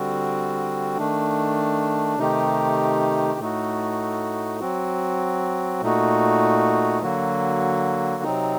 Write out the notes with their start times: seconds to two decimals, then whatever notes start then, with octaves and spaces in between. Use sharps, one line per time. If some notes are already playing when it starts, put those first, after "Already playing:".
Already playing: D3 G3 C4 F#4
0.98 D#3 A3 D4
2.18 C3 D#3 A3 D#4 G4
3.39 A2 A3 D#4 F#4
4.61 F#3 C4 F#4
5.82 A#2 A3 D#4 F#4
7.02 D3 F#3 A#3 F#4
8.23 C3 F#3 C4 D#4